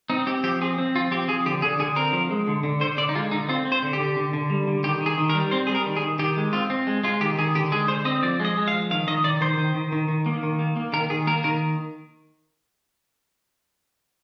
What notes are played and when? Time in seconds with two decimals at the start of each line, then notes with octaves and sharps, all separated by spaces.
0.10 C4 D#4
0.26 C4 G4
0.44 F3 G4
0.61 C4 G#4
0.78 C4
0.95 F3 F4
1.11 C4 G4
1.28 F3 G#4
1.46 D3 G4
1.62 D3 G#4
1.79 D3 G#4
1.96 C4 A#4
2.13 F3
2.31 G#3
2.48 D3
2.63 D3
2.80 D3 C5
2.97 D3 D5
3.09 D#4
3.15 G#3 F4
3.31 D3 D#4
3.49 C4 F4
3.65 C4
3.72 C5
3.83 D3
3.93 G4
4.00 D3
4.16 D3
4.33 D3
4.50 G3
4.67 D3
4.84 D#3 G4
5.01 D#3
5.06 G#4
5.18 D#3
5.30 A#4
5.34 G3
5.51 C4 C5
5.67 G3 G#4
5.75 A#4
5.86 D#3
5.97 G#4
6.03 D#3
6.19 D#3 G4
6.37 G#3
6.53 C4 F4
6.70 C4
6.87 G#3
7.04 G#3 F4
7.21 D#3 G4
7.38 D#3 G#4
7.55 D3 G4
7.72 G#3 G#4
7.88 D3 C5
8.05 C4 D#5
8.23 F3 D5
8.40 G#3
8.45 D#5
8.57 G#3
8.68 F5
8.73 F3
8.91 D#3 F5
9.07 D#3 D#5
9.24 D#3 D5
9.41 D#3 C5
9.58 D#3
9.75 D#3
9.92 D#3
10.08 D#3
10.26 A#3
10.43 D#3
10.59 A#3
10.76 A#3
10.93 D#3 A#4
11.10 D#3 G#4
11.27 A#3 A#4
11.44 D#3 A#4